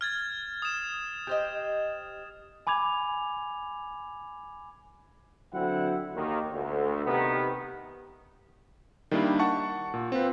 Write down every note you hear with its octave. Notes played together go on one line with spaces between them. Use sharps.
F6 G#6 A6
D#6 E7
G4 C5 D#5
G#5 B5 D6 G#6 F7
D3 F#3 C4 E4 F#5
D#2 D#3
D2
C3 D#3 B3
D#3 G3 A#3 D4 E4
F#5 A5 C#6
A#2
C4 F4 B4